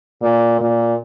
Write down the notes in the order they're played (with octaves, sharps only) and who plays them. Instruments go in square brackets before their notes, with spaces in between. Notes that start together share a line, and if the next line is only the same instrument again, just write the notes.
[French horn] A#2
A#2